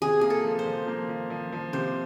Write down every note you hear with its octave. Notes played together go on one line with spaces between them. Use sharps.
C3 G#4
A#3 G#4
A4
F3
C5
F3
A#3
F3
F3
F3
C3 C5